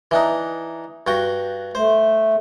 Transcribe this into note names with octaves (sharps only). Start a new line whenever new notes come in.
E3 D4 D#4
G2 F#4 G5
A3 C5